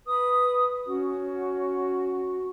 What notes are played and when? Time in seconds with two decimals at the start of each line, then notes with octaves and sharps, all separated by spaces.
0.07 B4 D#6
0.86 C#4 F#4